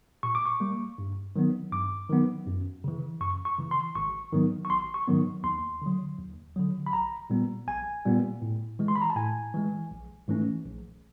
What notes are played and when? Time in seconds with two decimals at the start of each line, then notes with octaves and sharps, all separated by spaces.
0.23 A#2 C#6
0.35 D6
0.46 C#6
0.60 G3 A#3
0.98 G2
1.36 D#3 F#3 B3
1.72 G2 D6
2.10 D#3 F#3 B3
2.47 F#2
2.84 C#3 E3
3.21 F#2 C#6
3.45 C#6
3.59 C#3 E3
3.71 C6
3.95 G#1 C#6
4.33 G#2 D#3 F#3 B3
4.65 C#6
4.70 G#1 C6
4.94 C#6
5.08 G#2 D#3 F#3 B3
5.44 D#2 C6
5.82 D3 F#3
6.19 D#2
6.56 D3 F#3
6.86 B5
6.93 A#1 A#5
7.30 A#2 G3 B3
7.67 A#1 G#5
8.05 A#2 G3 B3
8.42 A2
8.79 E3 G#3
8.88 C6
8.96 B5
9.02 A#5
9.10 A5
9.16 A2 G#5
9.54 E3 G#3
9.91 A#1
10.28 G#2 E3 A3 C#4
10.65 A#1